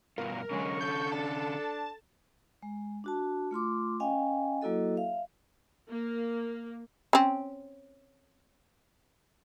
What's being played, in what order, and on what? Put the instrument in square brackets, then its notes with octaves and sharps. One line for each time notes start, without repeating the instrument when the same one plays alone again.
[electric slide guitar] G2 B2 F4 [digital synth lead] A#4
[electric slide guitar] D3 C#4 [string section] F#3 G#3 [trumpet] C#6
[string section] A4 [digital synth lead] G6
[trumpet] D4 [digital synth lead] A5
[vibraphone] G#3
D4 F#4 A5
A3 F4 C6 D6
C#4 D#5 F5 G5 G#5
F#3 A#3 E4 F#4 A4 D#5
E5 F5
[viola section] A#3
[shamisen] C4 C#4